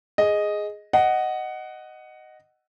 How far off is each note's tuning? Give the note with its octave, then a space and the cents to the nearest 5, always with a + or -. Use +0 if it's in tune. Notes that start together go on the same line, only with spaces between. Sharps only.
G#4 +0 D#5 +0
D#5 -5 F#5 +10